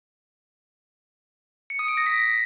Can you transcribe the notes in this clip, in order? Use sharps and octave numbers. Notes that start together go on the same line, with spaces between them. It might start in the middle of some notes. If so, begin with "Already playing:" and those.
C#7
D#6
D7
A#6
B6